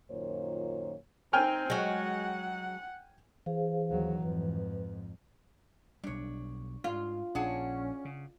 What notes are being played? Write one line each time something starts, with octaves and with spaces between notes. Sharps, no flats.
F#2 A#2 D#3 F4 C5 C#5
C4 D#4 G5 G#5 F6
F#3 G#3 F#5
E3 G#4 C5 F5
D#2 F#3
F2 G#2 B4
B1 G3 D4 C#5
G#2 F4
A#1 C#4 D4 G#4 F#5
C#3